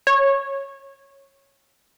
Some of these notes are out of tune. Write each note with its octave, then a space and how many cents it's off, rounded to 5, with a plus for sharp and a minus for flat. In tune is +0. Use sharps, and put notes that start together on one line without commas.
C#5 -15